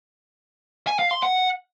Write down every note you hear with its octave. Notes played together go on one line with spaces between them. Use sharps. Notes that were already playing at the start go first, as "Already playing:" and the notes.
G#5
F5
C6
F#5